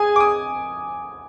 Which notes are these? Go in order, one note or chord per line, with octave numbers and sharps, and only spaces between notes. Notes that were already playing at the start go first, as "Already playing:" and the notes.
Already playing: G#4 G#5
D6
D#6